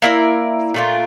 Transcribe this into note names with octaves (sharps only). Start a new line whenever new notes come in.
A#3 E4 A#4 D5
A#2 A3 D4 F4